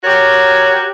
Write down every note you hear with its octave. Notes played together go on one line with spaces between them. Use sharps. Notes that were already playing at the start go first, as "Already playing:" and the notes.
F#4 G4 A#4 C#5